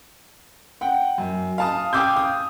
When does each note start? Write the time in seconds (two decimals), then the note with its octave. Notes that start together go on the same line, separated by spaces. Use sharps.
0.81 F#5 G5
1.18 F#2
1.58 F5 A5 D#6
1.93 F5 G5 G#5 D6 E6 G6
2.16 D#6